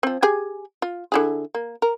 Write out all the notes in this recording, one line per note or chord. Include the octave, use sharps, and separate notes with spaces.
F3 C4
G4 G#4 G#5
F4
D3 E4 G#4
A#3
A#4